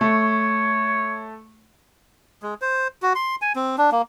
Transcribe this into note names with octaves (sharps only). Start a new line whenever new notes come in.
A3 C#5
G#3
C5
F#4
C6
G#5
C4
D4
A#3